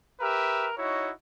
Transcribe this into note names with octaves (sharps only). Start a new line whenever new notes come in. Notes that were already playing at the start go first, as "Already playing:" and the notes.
G4 A#4 B4 E5
D#4 E4 F#4 C#5